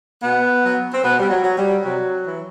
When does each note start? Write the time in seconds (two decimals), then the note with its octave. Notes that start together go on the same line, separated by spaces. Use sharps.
0.22 B2 B3
0.63 F#3
0.92 C4
1.02 B2 B3
1.19 G3
1.29 F#3
1.43 F#3
1.56 G3
1.84 C3 F#3
2.25 E3